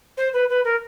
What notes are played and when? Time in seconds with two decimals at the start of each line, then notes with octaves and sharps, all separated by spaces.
0.17 C5
0.33 B4
0.49 B4
0.64 A#4